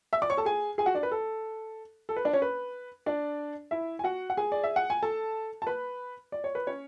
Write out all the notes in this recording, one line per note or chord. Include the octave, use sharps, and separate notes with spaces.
E5 E6
D5 D6
C#5 C#6
A4 A5
G#4 G#5
G#4 G#5
F#4 F#5
D4 D5
B4
A4
A4
B4
D4 D5
C#4 C#5
B4
D4 D5
E4 E5
G#5
F#4 F#5
F#5
G#4 G#5
D5
E5
F#5
G#5
A4 A5
A5
B4 B5
D5
C#5
B4
C#4 C#5